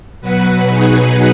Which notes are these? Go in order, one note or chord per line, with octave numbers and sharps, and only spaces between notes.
B2 F#3 F#4 B4
D#4 G#4